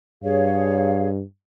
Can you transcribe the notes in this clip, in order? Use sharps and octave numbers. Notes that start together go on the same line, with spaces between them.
G2 G#4 C#5 F5